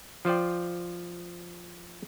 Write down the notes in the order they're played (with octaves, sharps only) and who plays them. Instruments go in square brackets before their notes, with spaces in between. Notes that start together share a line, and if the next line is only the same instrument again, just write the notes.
[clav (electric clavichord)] F3 F4 C5 D5 G5